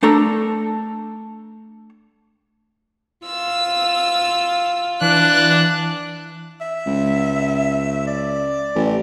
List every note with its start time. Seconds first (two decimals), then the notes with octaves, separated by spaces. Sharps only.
0.03 A3 D4 A4 A#5
3.26 F4 E6
5.01 E3 D4 F#6
6.61 E5
6.86 C#2
8.07 D5
8.75 A1